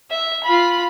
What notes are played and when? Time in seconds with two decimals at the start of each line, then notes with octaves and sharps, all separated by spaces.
0.10 E5
0.44 F4 B5